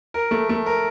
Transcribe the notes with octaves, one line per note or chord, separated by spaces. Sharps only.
A#4
A3
A3
A#4